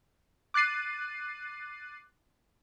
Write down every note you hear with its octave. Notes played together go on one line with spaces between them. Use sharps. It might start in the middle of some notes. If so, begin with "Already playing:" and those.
D6 F#6 A6 C7 D#7